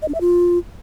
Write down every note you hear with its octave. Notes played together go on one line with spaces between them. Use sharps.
D#5
D4
E5
F4